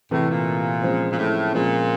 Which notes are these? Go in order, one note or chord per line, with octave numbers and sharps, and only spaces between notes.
A2 C3 E3 A3
A#2
C#3 F3 G#3 C4
A#2
A2
A#2 C#3 F3 G#3 C4